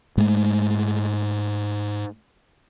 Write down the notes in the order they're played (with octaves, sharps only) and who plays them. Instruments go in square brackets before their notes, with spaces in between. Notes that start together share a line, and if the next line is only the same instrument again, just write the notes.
[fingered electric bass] G#2 G#3 A3